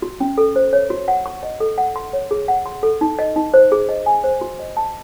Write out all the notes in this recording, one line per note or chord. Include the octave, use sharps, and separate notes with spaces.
F#4
C#4
A4
C5
C#5
F#4
F#5
C#6
D#5
A4
F#5
C6
C#5
G#4
F#5
C6
A4
D#4
D#5
D#4
C5
G#4
D#5
G#5
C5
F#4
D#5
A5